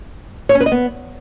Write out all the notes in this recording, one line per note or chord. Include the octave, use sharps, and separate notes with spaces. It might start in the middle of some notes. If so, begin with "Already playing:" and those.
C#5
C#4
B4
D#5
B3